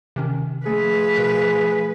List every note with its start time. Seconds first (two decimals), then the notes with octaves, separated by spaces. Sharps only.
0.16 C3 D#3 C#4
0.66 F3 A3 G#4 B4
1.16 B2 A#4 F#6